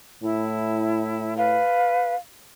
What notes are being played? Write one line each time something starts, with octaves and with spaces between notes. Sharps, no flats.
A2 E4
B4 F5